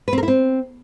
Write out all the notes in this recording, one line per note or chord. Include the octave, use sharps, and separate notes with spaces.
B4
C4
A#4
E4
C4